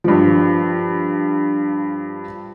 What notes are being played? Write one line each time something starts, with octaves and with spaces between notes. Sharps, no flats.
G2 F3